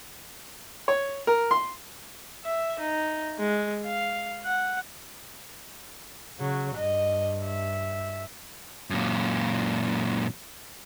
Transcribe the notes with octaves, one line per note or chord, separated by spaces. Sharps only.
C#5
A#4
C6
E5
D#4
G#3
F5
F#5
C#3 F#3
G2 D#5
E5
F#2 A#2